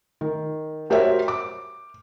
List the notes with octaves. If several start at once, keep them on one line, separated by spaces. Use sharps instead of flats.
D#3
F#4 G4 A#4 C5 C#5 E5
D6